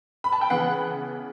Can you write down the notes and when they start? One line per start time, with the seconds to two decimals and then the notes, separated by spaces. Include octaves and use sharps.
0.24 B5
0.32 A5
0.41 G5
0.50 C#3 E3 B3 F#5